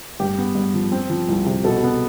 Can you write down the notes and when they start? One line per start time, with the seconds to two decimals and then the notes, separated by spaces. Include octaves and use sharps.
0.20 G2 G4
0.38 B3
0.55 G2
0.74 F3
0.92 C4
1.10 F3
1.29 C2
1.46 C3
1.64 B2 A4
1.83 B3